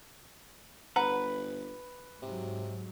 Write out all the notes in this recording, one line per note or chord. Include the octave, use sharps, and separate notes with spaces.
G1 B4 F#5 A#5
G#2 C3 F#3